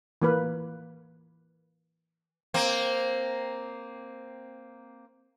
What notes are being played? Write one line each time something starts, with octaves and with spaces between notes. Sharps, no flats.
E3 A#3 B4
A#3 C4